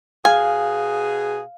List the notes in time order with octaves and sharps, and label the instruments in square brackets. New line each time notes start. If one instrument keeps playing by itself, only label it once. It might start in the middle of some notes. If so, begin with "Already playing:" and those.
[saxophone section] B2 G#4 [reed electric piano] F5 [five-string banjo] G#5